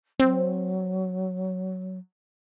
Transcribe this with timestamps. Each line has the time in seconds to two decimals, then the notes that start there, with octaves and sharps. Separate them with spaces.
0.20 F#3 C4